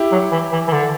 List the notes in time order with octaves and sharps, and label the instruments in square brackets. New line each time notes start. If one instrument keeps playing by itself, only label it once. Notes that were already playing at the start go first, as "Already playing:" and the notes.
Already playing: [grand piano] E4 G4
[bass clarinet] F#3
E3
E3
E3
D3